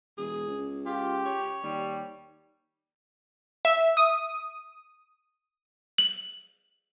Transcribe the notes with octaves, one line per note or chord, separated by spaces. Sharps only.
E1 G#4
C#2
F4 G4
C#5
D#2 G3
E5
D#6
F#7